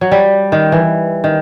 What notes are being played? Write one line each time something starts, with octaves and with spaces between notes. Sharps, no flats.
F#3
G3
D#3
E3
D#3